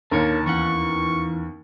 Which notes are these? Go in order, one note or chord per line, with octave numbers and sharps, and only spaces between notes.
D#2 D3 A#4 C#5 A5
E2 E3 C#4 F#5 C#6